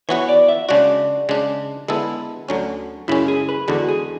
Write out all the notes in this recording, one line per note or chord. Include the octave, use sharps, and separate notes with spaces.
E3 B3 F#4 B4 C#5
D5
E5
C#3 G#3 D4 F#4 D5
C#3 G#3 D4
D3 G#3 B3 E4 A4 B4
D2 D3 F#3 C#4
F#2 C#3 G#3 C#4 E4
G#4
B4
E2 D3 G#3 F#4
G#4